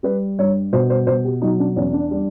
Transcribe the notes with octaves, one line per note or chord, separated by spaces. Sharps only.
G3 B4
G2 C#5
B2 C5
C5
B2 C5
G4
F#3 D#4
D4
E2 C#4
D4
G3